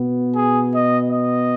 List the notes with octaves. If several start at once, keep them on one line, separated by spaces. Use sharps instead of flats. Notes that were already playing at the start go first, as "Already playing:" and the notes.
Already playing: B2 B3
G#4
D#5
D#5